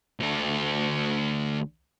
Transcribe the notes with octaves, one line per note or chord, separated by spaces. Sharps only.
D2 A4